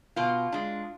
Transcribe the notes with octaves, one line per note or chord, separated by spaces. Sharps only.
B2 F4
G#3 D4